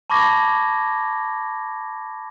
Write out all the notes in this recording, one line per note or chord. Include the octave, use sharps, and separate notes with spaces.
A5 B5 C#6 D6 G#6 A#6